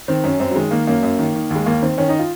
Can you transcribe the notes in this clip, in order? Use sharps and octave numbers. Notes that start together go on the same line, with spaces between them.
D#3 C4
F#2 C#4
F#2 C4
F#3
D#3 G#3
D#3 A#3
F#2 A#3
F#2
D#3
D#3
D#2 G#3
D#2 A#3
D#3 C4
D#3 C#4
D#4
F4